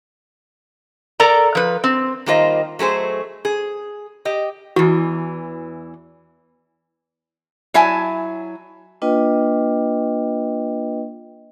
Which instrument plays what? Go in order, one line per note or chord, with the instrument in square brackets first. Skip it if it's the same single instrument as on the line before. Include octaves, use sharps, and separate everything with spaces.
[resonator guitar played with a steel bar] A4 A#4 D5 A#5
F3 B4
C4
D#3 G3 A#3 F4 C5 D#5
F#3 A3 G#4 C5
G#4
G4 D#5
[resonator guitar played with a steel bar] E2 E3 [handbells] F#4
[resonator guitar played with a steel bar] F#3 E4 E5 G#5 A5
[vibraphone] A#3 D4 F4 B4 D#5 G5